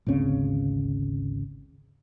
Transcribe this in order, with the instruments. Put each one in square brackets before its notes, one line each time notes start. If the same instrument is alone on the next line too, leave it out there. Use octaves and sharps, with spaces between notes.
[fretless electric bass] G#1 D2 C#3 C4